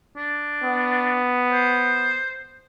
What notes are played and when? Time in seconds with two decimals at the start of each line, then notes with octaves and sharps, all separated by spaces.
0.17 D4
0.64 B3
1.52 C5